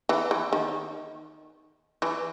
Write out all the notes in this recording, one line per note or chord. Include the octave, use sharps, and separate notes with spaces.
E3
E3
D#3
E3